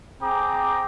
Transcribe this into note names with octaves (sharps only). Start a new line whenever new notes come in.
C4 G#4 G5 A#5 D6